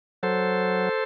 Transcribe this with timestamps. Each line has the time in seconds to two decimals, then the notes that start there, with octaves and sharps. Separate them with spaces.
0.23 F#3 A4 C5